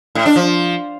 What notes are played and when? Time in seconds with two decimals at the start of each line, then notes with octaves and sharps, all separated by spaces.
0.15 A2
0.26 D4
0.36 F3